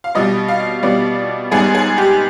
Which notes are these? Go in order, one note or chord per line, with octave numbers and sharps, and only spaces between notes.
F5
B2 G3 B3 D#5
F5
B2 G3 B3 D5
G#2 G3 B3 G#4
G#4
G4